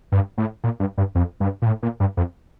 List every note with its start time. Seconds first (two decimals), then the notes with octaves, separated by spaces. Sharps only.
0.12 G2
0.38 A2
0.64 A#2
0.80 G2
0.98 G2
1.15 F2
1.40 G2
1.62 A#2
1.66 A2
1.83 A#2
2.00 G2
2.17 F2